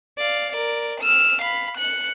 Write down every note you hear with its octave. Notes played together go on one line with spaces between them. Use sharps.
D5 F5
A#4 D5
E6 F6
F5 B5
F#6 C#7